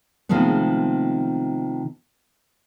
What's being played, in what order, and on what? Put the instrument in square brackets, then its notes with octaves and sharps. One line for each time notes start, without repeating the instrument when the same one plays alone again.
[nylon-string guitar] C3 D#3 F3 G#3 A3 B3